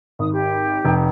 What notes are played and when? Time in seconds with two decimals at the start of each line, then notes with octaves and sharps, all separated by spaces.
0.19 G#1 D#6
0.32 G4
0.85 F1